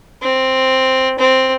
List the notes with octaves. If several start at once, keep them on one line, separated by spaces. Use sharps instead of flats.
C4
C4